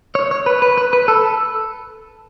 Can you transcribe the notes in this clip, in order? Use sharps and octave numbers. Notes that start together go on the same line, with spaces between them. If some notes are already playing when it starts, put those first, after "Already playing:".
C#5
C#5
B4
B4
B4
B4
A4